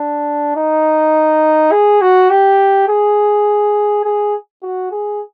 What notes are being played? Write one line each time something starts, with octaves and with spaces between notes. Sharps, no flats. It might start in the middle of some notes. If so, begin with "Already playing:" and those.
Already playing: D4
D#4
G#4
F#4
G4
G#4
G#4
F#4
G#4